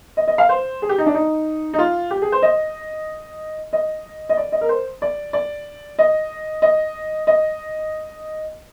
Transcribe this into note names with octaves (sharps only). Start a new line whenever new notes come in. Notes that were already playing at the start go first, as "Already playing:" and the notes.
D#5
D#5
F5
C5
G#4
G4
D#4
D4
D#4
D#4
F4
G4
G#4
C5
D#5
D#5
D#5
D5
D#5
A#4
C5
D5
D5
D#5
D#5
D#5